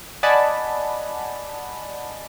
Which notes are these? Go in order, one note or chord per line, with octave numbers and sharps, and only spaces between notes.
D5 D#5 F#5 G#5 A5 B5